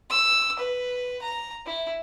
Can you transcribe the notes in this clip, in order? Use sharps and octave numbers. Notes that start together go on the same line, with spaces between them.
E6
B4
A#5
E4